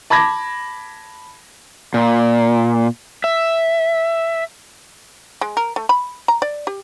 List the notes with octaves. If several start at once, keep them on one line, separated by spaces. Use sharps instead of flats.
A5 B5 D6 G#6 A#6
A#2
E5
G#3
A#4
A3
B5
A#5
D5
G4